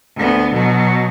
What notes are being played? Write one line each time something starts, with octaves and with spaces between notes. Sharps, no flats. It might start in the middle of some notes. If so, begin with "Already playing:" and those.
D2 B3
B2 F#3